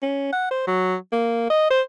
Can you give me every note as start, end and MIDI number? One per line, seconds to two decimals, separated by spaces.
0.02 0.28 61
0.32 0.51 78
0.51 0.64 72
0.67 0.95 54
1.12 1.46 58
1.50 1.68 75
1.71 1.81 72